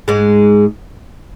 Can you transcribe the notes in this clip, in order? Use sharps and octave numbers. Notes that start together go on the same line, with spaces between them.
G#2 G#3